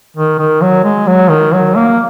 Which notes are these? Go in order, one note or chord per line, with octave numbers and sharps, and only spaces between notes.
D#3
D#3
F#3
G#3
F#3
D#3
F#3
A#3